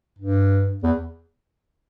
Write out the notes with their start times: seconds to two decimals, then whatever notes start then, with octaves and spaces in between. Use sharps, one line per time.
0.19 G2
0.83 E2